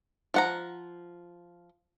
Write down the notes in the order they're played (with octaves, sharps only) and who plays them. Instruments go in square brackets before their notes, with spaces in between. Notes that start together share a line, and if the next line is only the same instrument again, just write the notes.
[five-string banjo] F3 F#5 A#5